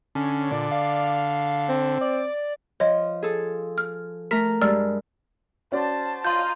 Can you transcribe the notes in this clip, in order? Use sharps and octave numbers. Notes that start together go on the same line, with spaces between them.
D3 C#4
A#2 D5
F5
C4
D5
F3 C#5 D#5
G#4 A4
F6
A3 A#4 B6
G2 G#3 D5 E6 F6
C#4 F#4 C5 D5 A5
F4 D#5 A#5 C6 G6